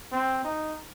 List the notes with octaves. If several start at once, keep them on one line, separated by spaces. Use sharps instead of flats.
C4
D#4